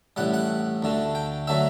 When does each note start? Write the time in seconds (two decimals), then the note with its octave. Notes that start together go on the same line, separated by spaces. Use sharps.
0.16 A1 A2 G3 F#5
0.34 F#5
0.82 D2 D3 A3
1.15 G5
1.47 D3 F#3 A3 E5